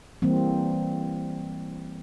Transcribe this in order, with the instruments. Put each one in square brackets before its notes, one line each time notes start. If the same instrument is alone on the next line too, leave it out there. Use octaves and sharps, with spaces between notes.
[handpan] E3 G3 A#3 C4